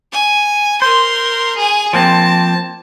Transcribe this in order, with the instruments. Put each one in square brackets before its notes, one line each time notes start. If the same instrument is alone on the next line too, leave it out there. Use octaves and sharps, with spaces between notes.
[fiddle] G#5
[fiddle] A#4 C6 [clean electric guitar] C5
[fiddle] G#4 G#5
[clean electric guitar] F3 A#3 C4 [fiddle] A5